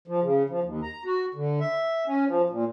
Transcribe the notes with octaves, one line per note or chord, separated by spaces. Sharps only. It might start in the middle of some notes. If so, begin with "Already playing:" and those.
F3
C#3
F3
D#2
A#5
F#4
D3
E5
C#4
F3
A#2